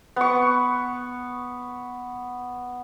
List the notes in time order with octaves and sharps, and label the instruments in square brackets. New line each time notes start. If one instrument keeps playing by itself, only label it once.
[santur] B3 C#6